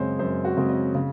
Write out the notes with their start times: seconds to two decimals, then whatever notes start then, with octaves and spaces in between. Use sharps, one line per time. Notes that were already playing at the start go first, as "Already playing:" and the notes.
Already playing: F#2 C#3 G#3 C4 C5 C#5
0.19 F#2 C5
0.45 F#4
0.57 C#3 G#3 C4
0.69 D#5
0.94 C#3